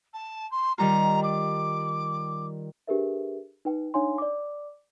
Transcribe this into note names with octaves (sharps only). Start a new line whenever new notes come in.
A5
C6
D#3 G3 F4 A#5
D6
D4 G4 G#4 A#4 B4 E5
D#4 B4 G5
D4 D#4 C#5 F5 G#5 C6
D5 D6